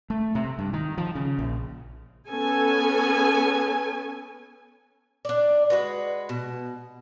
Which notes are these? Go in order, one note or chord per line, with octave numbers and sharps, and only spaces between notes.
A3
C3
G2
D#3
F3
C#3
A#1
B3 C#4 A4 G#5
D4 D5
G#3 F#4 B4
B2